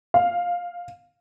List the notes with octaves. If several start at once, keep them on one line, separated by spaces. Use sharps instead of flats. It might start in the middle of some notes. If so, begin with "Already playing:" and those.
F5